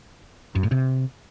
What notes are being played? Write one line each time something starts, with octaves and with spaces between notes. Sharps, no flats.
F#2
A2
C3